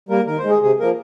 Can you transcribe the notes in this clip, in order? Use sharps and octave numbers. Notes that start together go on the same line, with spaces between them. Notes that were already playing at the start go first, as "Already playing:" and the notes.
G3 A#3 A#4
D#3 A#4
C5
G#3
G#4
C3 G#4
F3 A#3 A#4